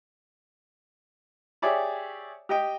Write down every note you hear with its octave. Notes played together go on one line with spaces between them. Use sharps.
G4 G#4 C#5 D5 E5
G4 D#5 G5